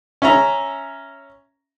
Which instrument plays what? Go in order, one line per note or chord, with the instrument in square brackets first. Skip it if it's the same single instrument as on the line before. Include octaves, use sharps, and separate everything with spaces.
[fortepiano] C#4 E5 A#5